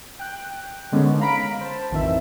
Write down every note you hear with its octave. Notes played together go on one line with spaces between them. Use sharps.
G5 F#6
D3 D#3 G#3 B3 C#4 D4
F5 A#5 B5 B6 D7
C5 A5
A1 F2 D#3 E3 C4 E5